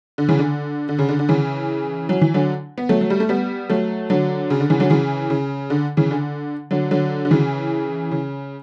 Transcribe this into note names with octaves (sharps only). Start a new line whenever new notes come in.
D3
C#3 E3
D3
D3
C#3
D3
D3
C#3 E3
F#3
E3
D3 F#3
B3
F#3 A3
F#3
G3
A3
G3 B3
F#3 A3
D3 F#3
C#3
D3
C#3 E3
D3 F#3
C#3 E3
C#3
D3
C#3 E3
D3
D3 F#3
D3 F#3
D3
C#3 E3
C#3